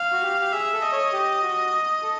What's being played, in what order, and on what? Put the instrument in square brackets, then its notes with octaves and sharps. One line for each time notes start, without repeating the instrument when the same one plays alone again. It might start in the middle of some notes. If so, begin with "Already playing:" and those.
Already playing: [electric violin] F5
[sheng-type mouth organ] F#4
G4
G4
[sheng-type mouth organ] G#4 [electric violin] E5
[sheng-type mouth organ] A4
[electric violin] D#5
[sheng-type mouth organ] C#5
G4
F#4
A4